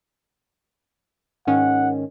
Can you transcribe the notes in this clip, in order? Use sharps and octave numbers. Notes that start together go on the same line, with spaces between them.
G#2 D#3 C#4 F#5